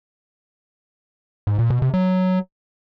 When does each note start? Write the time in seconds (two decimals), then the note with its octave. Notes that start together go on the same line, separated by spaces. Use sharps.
1.47 G#2
1.59 A#2
1.70 B2
1.82 C3
1.94 F#3